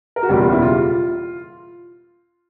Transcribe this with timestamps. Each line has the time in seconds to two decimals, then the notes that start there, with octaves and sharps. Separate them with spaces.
0.16 A#4
0.23 F#4
0.28 F#1 E2 B2 G3 G4
0.39 F4
0.52 E4
0.62 F4